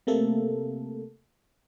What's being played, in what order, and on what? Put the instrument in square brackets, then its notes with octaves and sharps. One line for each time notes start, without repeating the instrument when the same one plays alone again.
[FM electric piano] C3 A3 A#3 A4